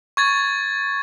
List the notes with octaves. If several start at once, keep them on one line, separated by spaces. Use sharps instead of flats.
C#6 G#6 A6